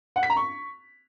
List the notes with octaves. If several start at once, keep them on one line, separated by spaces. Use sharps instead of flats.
F#5
B6
A#5
C#6